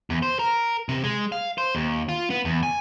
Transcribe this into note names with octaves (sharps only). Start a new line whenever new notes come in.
E2
C5
A#4
C3
G#3
F5
C5
D#2
F4
B3
E2
G#5